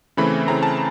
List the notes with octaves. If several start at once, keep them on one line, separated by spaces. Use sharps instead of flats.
C#3 E3 A3 C4 B5
C#3 E3 A3 C4 A#5
A5